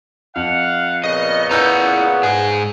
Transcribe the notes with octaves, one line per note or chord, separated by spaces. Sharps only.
F2 F5 F#5
A#2 C#3 B3 D#5
E4 B4 F#5 A#5 E6 G6
G#2 G#4